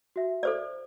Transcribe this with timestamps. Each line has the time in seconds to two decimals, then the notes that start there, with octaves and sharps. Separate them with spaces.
0.16 F#4 E5
0.43 A4 C5 D5